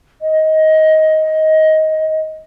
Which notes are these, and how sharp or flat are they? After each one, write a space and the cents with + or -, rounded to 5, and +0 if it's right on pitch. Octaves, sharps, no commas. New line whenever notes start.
D#5 +15